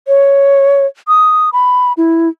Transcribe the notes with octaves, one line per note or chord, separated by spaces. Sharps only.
C#5
D#6
B5
E4